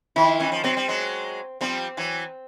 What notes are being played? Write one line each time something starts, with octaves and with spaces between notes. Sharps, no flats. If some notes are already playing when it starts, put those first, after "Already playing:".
D#3 F3 E4
E3 C#4
F3
F#3 C4
G3
F#3 G#3
F3 G3 C4
E3 F#3